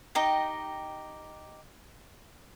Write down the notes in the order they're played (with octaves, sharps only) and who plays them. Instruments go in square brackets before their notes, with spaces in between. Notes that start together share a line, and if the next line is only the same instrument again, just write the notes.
[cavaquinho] D#4 G4 D#5 G5